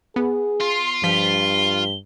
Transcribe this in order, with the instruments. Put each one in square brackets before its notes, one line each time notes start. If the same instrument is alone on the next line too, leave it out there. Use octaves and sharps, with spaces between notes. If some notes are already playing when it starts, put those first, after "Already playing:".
[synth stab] B3 [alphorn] G#4
[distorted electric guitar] F4 [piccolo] C6
[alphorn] G2 [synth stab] F3 B6 [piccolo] G7